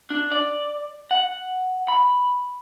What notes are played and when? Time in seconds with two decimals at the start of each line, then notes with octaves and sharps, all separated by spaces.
0.10 D4
0.32 D5
1.11 F#5
1.88 B5